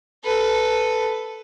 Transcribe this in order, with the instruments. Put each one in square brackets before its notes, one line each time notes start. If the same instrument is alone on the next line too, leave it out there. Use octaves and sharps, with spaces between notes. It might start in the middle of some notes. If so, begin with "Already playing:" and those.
[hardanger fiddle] A4 B4